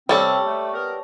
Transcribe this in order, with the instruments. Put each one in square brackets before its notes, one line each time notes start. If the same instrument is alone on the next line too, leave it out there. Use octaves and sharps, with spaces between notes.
[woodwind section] C3 C4 [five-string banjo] G3 A4 [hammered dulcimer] C#5 A5
[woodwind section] A3
B3 A#4